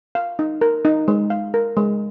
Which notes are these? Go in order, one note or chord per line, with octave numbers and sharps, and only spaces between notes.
F5
D#4
A#4
D#4
G#3
F5
A#4
G#3